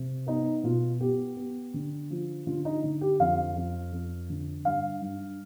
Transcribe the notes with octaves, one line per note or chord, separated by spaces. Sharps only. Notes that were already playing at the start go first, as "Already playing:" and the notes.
Already playing: C3
B3 D#4
B2 F4
B3 G4
B3
D3
F3
D3 F4
D#4
D3
G4
F2 F5
F2
F2
D3
G2 F5
G2